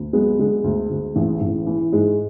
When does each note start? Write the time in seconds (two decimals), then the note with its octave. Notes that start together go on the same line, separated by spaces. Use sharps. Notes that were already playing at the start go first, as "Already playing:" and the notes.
Already playing: D2
0.13 F#3 G#3 B3
0.39 D3 G#3 B3
0.64 D2
0.89 D2
1.16 A1
1.41 A1
1.67 E3
1.92 G#2 G#3